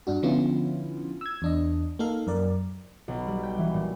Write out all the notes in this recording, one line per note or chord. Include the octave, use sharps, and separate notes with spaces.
G2 D4 F#4
D3 F3 B3 C#4 E4 F4
E6 G#6
E2 D4 D#5
A#3 D#4 A4 F5
F#2 A#4 D5
B1
G3
G5
E3
A#2